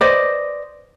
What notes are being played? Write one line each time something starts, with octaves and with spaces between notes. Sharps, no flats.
B4 C5 D5 D#5